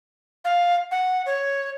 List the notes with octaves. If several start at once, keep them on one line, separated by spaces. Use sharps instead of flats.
F5
F#5
C#5